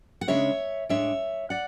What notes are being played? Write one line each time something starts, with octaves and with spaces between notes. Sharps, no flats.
F#5
C#3 G#3 D4 C#5 E5
A2 G#3 D4 C#5 E5
D5 F#5